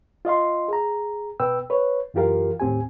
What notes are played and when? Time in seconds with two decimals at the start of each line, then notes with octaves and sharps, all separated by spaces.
0.25 F4 D#5 F5 C6
0.68 G#4 A#5
1.40 B2 B4 G5 E6
1.70 B4 C#5
2.14 F#2 E3 F4 G4 A#4 F5
2.60 D#2 A2 C4 G4 G#5